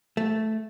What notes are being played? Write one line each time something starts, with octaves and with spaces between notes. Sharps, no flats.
A3